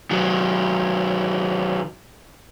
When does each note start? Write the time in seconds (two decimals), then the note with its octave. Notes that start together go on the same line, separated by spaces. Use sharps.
0.11 D#3 F#3